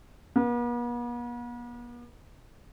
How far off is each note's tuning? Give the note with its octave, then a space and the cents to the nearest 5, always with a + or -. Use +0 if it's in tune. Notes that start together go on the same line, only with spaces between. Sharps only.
B3 -45